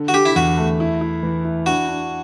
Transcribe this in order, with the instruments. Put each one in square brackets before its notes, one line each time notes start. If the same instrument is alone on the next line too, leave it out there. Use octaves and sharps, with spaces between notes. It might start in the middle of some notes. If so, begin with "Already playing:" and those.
Already playing: [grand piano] D3
[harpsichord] F#4
[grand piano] D3 [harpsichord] G4
[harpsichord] E4
[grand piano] E2 [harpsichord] F#4
[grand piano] A3
E4
E4
E3
E4
[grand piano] D4 [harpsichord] F#4
[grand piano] D4